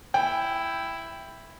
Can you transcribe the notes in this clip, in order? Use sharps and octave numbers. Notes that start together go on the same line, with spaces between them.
E4 G5